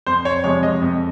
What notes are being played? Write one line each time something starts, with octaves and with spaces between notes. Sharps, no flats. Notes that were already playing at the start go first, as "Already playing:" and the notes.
F2 C5
C#5
C3 F3 G#3 C#5
D#5
F2